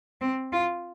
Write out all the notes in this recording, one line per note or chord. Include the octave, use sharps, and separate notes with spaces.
C4
F4